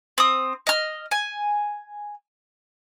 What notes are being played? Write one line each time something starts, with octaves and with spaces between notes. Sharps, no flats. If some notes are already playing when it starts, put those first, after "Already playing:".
C4 D#6
D#5 F6
G#5